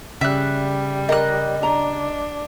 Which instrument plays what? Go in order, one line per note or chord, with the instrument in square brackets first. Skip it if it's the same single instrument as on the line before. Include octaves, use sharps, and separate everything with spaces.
[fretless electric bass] C#3 [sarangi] G3 [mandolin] E5 F#6
[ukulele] A#4 [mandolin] D#5 F#6
[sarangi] D4 [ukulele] A#5